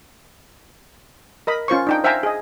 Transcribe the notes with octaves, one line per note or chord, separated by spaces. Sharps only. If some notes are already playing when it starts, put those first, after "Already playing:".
A#4 D#5 B5
C#4 F4 C5 C#6
D4 D#4 G5
C5 E5 F5 G5 G#5 A#5
G#4 D#5